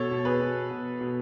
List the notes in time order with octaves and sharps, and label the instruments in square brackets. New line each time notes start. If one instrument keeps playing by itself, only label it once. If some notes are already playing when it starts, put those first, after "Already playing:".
Already playing: [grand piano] B2 A4 C#5
B2
G#4 B4
B2
B2
B2